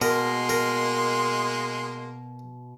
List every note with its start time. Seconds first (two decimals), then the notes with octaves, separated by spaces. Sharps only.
0.01 B2 G#3 A#3 A#4 C6
0.49 A#4